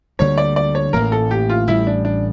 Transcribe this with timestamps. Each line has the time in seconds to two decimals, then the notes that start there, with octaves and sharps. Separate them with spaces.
0.19 D2 D3 G3 A#3 C#5
0.38 D5
0.56 D5
0.75 C#5
0.93 A1 A2 E3 A#3 A#4
1.12 A4
1.31 G4
1.50 F4
1.67 A1 A2 G3 E4
1.87 D4
2.05 D4